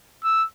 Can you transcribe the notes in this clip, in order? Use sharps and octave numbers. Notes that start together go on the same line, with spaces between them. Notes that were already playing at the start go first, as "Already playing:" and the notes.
E6